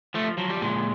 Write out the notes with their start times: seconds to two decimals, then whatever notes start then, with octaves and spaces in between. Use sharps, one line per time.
0.14 F3 A3
0.38 F3 F#3
0.50 G3
0.62 A#2 G#3